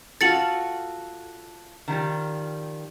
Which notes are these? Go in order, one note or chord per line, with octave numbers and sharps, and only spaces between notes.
F4 F#4 A4 A6 C#7 F#7
D#3 F3 G3